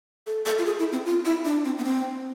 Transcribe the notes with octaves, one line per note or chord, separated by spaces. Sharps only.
A4
A4
F4
G#4
E4
C4
F4
E4
D4
C4
B3
C4